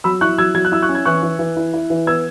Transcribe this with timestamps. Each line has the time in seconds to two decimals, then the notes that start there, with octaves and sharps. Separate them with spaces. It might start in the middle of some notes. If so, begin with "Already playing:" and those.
0.04 F#3 B5 E6
0.21 E4 C#6 F#6
0.38 F#3 E6 G#6
0.55 F#3 G#6
0.65 F#6
0.72 E4 E6
0.82 C#6 F#6
0.89 C#4
0.95 G#6
1.05 E3 C#6 F#6
1.23 E3
1.39 E3
1.57 E4
1.74 E4
1.90 E3
2.07 B3 E6 G#6